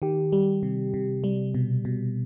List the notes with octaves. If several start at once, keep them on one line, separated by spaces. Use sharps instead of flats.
D#3 G4
G3
C3
C3
G3
B2
B2